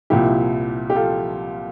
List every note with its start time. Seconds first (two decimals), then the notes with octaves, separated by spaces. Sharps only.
0.10 C2 A#2 F3 E4 G4
0.90 G4
0.95 F4 A4